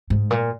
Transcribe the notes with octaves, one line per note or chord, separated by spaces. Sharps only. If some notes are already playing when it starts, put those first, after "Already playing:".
G#2
A#2